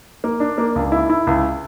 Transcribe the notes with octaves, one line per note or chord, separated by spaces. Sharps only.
A#3
D4
A#3
C#2
E4
E4
C#2